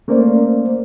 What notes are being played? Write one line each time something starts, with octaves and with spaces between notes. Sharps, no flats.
A3 A#3 C#4 A#4 C5 D5